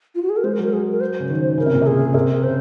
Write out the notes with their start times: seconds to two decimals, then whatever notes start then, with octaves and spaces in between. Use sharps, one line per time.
0.15 F4
0.22 F#4
0.29 G#4
0.36 A#4
0.44 G#3 C5
0.53 A#4
0.58 F#3
0.64 A#4
0.73 G#4
0.91 A#4
1.00 C5
1.20 C#3
1.30 D#3
1.58 C#3 A#4
1.66 C3
1.74 A#2
1.81 C3 G#4
2.14 C3 A#4
2.43 C#3 C5